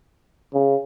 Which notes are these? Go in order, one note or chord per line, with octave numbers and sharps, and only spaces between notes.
C#3